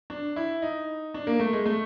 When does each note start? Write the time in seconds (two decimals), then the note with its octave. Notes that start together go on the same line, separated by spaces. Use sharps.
0.10 D4
0.36 E4
0.62 D#4
1.14 D4
1.27 A#3
1.40 A3
1.53 G#3
1.66 A3